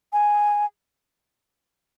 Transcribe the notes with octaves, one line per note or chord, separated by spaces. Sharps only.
G#5